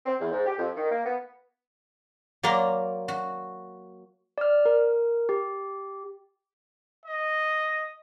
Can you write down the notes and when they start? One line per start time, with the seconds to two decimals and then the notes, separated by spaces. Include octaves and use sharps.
0.06 C4
0.20 E2
0.32 G#2
0.46 G4
0.59 F2
0.77 D#3
0.91 A#3
1.06 B3
2.43 F#3 A#3 A#4 D5 A#5 C6
3.08 F#4
4.38 D5 F6
4.65 A#4
5.29 G4
7.05 D#5